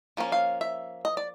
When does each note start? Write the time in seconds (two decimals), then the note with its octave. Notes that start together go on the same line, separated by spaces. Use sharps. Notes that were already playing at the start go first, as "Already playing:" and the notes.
0.17 F3 A#3 C#4
0.32 F5
0.61 E5
1.05 D#5
1.17 D5